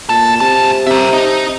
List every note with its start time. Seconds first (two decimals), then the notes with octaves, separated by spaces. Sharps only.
0.09 A#2 A4
0.41 G#2 C3 A5
0.87 C3 A#4 E5
1.13 D#4